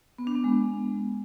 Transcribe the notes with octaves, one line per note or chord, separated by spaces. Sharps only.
B3
D4
B3
G#3